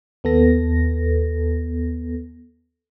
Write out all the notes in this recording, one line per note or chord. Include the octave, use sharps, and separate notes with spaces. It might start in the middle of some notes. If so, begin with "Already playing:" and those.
D#2 B3 A4 A#6